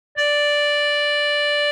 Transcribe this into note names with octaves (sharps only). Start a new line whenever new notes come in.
D5